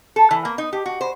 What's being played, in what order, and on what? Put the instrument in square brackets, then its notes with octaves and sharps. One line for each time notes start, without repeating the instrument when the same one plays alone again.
[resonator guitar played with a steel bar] A4
E3
A#3
D#4
G4
F#4
C5